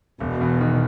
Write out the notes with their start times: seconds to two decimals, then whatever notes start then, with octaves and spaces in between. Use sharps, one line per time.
0.20 E1 B2
0.41 E2
0.61 D#3